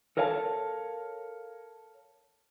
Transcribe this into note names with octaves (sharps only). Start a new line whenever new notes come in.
A4 A#4 C#5 F5 G5 A5